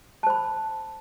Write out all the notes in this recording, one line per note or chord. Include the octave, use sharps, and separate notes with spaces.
C5 A5 B5